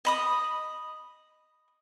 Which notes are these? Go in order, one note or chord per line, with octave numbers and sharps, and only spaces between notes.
D#5 B5 D#6